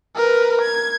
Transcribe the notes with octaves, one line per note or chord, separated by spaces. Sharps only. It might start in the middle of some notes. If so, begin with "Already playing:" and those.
A#4 B4
G#6